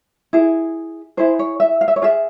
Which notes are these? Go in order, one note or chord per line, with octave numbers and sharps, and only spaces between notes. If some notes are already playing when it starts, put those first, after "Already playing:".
E4 G#4
E4 G#4 C5
C#5
E5
F5
E5
C#5
F4 G#4 E5